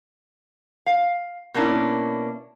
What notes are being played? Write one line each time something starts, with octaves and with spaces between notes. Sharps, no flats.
F5
B2 A#3 C#4 D4 E4